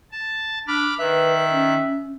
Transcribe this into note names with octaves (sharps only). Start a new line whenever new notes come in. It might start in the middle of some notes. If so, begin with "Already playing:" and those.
A5
D4 B5 D6 F6
D#3 B4 E5 F#6
C#4